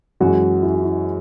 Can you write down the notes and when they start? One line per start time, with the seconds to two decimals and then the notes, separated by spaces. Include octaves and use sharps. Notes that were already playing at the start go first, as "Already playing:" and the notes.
0.20 F#2 E3 G#3 F#4
0.63 E4
0.73 F#4
0.82 E4